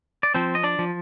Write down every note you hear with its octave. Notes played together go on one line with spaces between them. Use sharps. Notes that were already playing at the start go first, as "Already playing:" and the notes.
D5
F3 C4 C5
D#5
D4 D5
F3